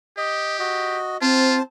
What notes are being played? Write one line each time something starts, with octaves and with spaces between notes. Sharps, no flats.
G4 D#5
F#4 D#5
C4 F4 C5 A5